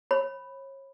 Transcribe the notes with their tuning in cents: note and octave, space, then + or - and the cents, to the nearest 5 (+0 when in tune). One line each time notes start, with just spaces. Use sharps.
C#5 -35 B5 +0